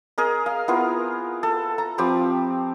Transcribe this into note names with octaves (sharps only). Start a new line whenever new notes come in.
G#4 A#4 D#5
F5
B3 E4 F4 A#4
A4
A#5
F3 C4 G4 B5